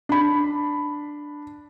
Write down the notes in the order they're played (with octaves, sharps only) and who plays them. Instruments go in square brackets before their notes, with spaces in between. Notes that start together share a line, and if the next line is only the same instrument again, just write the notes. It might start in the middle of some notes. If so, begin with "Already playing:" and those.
[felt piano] D4 B5